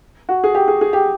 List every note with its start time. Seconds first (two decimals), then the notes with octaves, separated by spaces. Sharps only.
0.29 F#4
0.44 G#4
0.55 G4
0.68 G#4
0.81 G#4
0.93 G4